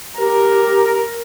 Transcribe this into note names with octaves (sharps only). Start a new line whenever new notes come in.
G4 A#4